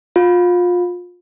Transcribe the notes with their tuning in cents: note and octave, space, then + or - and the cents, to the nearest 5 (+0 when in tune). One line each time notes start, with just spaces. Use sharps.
F4 +25